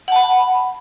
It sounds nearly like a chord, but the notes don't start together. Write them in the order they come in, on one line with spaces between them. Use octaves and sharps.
F#5 A5 B5